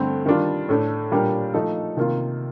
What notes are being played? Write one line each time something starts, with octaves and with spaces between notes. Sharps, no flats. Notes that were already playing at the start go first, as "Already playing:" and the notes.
Already playing: G2 D3 A3 C4
D#3 G3 D4 F4
A2 A3 D4
A#2 G3 D4 G4 A#4
F3 A3 D#4 A4
C3 D#3 A#3 F4